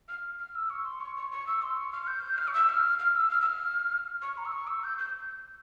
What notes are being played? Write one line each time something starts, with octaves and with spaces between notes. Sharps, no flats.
F6
F6
E6
C#6
C6
C#6
C#6
C#6
E6
C6
C#6
F6
G6
F6
C#6
E6
F6
F6
E6
F6
E6
F6
C#6
A#5
E6
C#6
E6
G6
G6